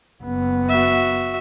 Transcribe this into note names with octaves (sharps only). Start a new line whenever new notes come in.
F#1 B3
F#4 E5